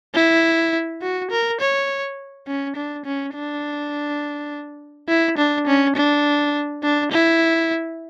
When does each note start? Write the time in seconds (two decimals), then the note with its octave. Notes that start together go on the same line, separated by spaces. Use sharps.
0.14 E4
1.02 F#4
1.31 A#4
1.60 C#5
2.47 C#4
2.76 D4
3.05 C#4
3.34 D4
5.09 E4
5.38 D4
5.67 C#4
5.96 D4
6.83 D4
7.12 E4